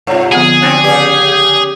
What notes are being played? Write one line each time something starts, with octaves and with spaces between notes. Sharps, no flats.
G2 C3 F4 C#5
D3 F3 B3 G#4
F#3 C4 D4 F#6 A6 A#6
C#3 G4 B4 D5 G#5
G6